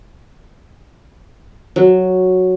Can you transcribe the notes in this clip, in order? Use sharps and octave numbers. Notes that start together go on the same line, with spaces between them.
F#3